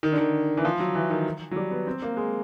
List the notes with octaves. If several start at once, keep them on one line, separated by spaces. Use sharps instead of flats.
D#3
D3
D#3
E3
F3
F#3
E3
D#3
F#3
G3
B3
C4
A#3
G#3